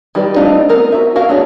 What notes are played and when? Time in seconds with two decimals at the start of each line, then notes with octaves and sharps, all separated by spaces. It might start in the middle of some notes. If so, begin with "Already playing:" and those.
0.15 D#3 G3 G4 B4 D5
0.36 A3 C4 D4 D#4 F4
0.69 B3 C4 A#4
0.92 F#4 E5
1.16 F#4 A#4 F5
1.29 A3 B3 D4 G#4 C#5